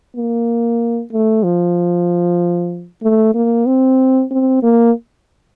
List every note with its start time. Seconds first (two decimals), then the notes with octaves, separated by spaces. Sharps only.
0.16 A#3
1.12 A3
1.44 F3
3.03 A3
3.35 A#3
3.66 C4
4.31 C4
4.63 A#3